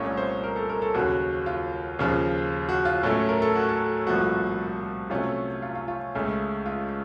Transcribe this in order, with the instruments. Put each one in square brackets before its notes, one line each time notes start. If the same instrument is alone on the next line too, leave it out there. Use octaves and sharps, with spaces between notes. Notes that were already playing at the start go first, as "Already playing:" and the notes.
Already playing: [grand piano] C2 A#2 A3 C#4 C#5
C5
A#4
A4
A#4
A4
D#2 C#3 F#3 F#4
F4
D#2 C#3 F3
F#4
F4
A2 F#3 A3 C#4 A4
A#4
A4
F#4
A4
C2 A#2 F3 A3 F#4
C3 F#3 A3 C#4 F4
F4
F4
F4
C#2 C#3 A3
F4